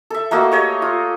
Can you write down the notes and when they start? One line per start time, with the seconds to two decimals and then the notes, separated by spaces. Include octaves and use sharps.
0.10 A4 E5
0.31 A3 A#3 F#4 D#5
0.52 G4 C#5 D#5
0.82 F4